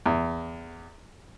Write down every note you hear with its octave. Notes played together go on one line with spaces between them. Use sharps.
E2